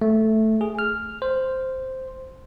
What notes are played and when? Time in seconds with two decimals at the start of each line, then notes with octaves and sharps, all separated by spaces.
0.02 A3
0.61 G#4
0.79 F6
1.22 C5